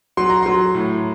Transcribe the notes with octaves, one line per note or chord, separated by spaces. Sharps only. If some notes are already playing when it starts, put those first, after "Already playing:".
F#3 C6
A#5
F#3 C6
A2